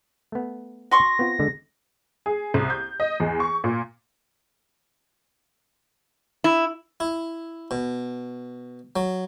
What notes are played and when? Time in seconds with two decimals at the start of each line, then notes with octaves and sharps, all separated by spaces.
0.32 A3 B3
0.91 F#4 C6 C#6 A#6
1.19 B3 C4 F4
1.39 D3 G#3
2.26 G#4
2.54 C2
2.70 G6
3.00 D#5
3.20 E2
3.40 C#6
3.64 A#2
6.44 E4
7.00 E4
7.71 B2
8.96 F#3